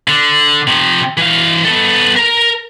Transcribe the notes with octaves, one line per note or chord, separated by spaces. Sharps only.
D3
C3 F3
E3 F5
B3 A4
A#4 A#5